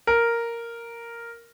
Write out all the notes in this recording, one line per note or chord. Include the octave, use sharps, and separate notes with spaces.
A#4